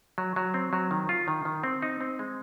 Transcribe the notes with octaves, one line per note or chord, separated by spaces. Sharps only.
F#3
F#3
C4
F#3
D#3
F4
D#3
D#3
C4
D#4
C4
G#3